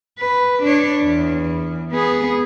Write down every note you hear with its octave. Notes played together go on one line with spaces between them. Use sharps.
B4
D4 C#5
E2
B3 G#4